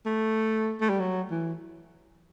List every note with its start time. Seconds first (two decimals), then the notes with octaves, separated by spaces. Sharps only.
0.05 A3
0.81 A3
0.89 G3
1.00 F#3
1.31 E3